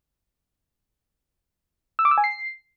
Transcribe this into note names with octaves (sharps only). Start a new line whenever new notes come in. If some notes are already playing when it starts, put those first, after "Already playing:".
E6
D6
E6
G#5
C7